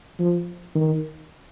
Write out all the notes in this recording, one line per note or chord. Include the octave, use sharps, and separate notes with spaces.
F3
D#3